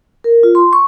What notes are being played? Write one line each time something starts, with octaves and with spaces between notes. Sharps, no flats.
A#4
F4
C6
C#6